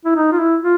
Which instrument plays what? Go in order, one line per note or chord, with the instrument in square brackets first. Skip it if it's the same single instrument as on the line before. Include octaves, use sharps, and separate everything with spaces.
[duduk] E4
D#4
F4
E4
F4